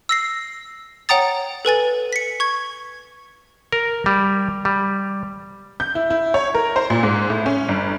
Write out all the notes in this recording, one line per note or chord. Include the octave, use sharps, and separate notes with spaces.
E6 A#6 C7
C#5 F#5 G5 A#5 D#6 A6
A4 B4 G#5 A6
B6 C#7
C#6 G#6
A#4
G3
G3
G6
E4
E4
C#5
A#4
C5
A#2
G#2
A2
C#4
G1